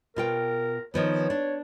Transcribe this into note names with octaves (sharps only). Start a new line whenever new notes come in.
B2 F4 A#4 G5
D#3 F3 B3 C#5
D4